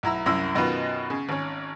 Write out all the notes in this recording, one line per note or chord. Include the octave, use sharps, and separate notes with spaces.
B1 E4 A#5 E6
C2 F#2 E4 E6
F#2 B2 D#3 F4 B4 D#5
C#3
G#1 C#4